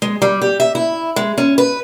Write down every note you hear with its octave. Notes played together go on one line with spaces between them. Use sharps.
G#3
G3
G4
E5
E4
G#3
C#4
B4